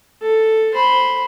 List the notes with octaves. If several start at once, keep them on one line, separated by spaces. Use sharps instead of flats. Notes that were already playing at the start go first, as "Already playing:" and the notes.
A4
C5 B5